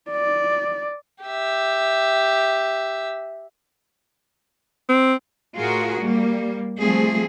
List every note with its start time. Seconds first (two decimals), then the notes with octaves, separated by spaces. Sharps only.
0.11 D5
1.24 G4 E5
4.89 C4
5.56 A2 F4 F#4 G#4 A#4
6.01 G3 A#3
6.80 F3 G3 A3 C4 G#4